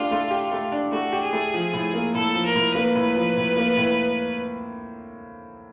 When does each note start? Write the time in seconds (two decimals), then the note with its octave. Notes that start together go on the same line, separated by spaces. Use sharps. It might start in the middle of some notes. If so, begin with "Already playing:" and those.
Already playing: A3 D4 F4 G4
0.11 A3
0.31 G4
0.52 A3
0.72 D4
0.92 A3 F#4
1.13 G4
1.23 G#4
1.33 A3
1.54 F3
1.73 A2
1.94 A#3
2.14 A2 A4
2.35 F3
2.46 A#4
2.55 A2
2.75 A#3 B4
2.95 A2
3.16 F3
3.37 A2
3.57 A#3
3.77 A2